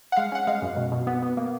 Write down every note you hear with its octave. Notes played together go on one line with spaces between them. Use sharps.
F#5
G#3 F5
C#4 F#5
G#3 F5
F#2
B2
B2
B3
B3
A#3